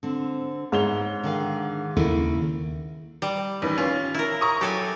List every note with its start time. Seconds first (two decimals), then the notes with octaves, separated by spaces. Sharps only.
0.03 D3 C4
0.72 G#2 B3 C#5 E5 F7 G7
1.24 D3 D#3 F5
1.97 D#2 C#3 E4 A4 A#4
3.22 G3
3.62 A1 D#3 B4
3.78 C#4 F4
4.14 E4 A#4
4.41 A#5 C#6 D#6
4.61 F#3 G4 A4 G#5